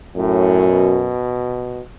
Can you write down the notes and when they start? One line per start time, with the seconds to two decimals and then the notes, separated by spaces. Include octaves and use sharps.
0.16 F#2 A2
0.70 B2